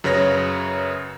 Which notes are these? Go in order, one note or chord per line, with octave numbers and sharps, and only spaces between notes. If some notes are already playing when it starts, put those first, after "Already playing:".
F#2 C#3 B4 C#5 A#6